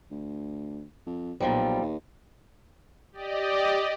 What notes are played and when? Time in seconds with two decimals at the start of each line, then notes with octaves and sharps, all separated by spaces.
0.11 D2
1.07 F2
1.40 B1 A#2 F3 G3
1.82 D#2
3.12 G4 D5 D#5